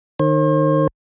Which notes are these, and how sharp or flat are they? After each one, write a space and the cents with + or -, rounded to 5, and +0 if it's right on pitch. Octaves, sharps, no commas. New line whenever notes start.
D#3 -30 C5 +45